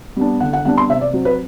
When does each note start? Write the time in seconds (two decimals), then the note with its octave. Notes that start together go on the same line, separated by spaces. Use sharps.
0.16 G3 B3 D4
0.40 D3 F#5
0.53 F#5
0.65 G3 B3 D4 F#5
0.78 C6
0.90 C3 E5
1.01 D5
1.13 F#3 C4
1.25 B4